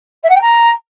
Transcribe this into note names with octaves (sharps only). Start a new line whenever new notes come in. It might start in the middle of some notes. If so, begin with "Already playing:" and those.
E5
F#5
G5
A#5